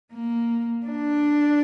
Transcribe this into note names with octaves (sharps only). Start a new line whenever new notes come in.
A#3
D4